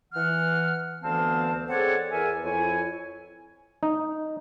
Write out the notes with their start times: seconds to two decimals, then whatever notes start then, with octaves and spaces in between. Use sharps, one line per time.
0.13 E3 F#5 F6
1.03 D2 E3 B3 C4 F5 A5
1.69 C4 G#4 A4 C#5 D5 F#5
2.11 E2 E4 A#4 E5 G#5
2.43 F2 E4 C#5 G#5
3.83 D#4